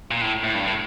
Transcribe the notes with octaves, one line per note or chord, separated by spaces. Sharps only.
A#2
A2
A2
G2
A2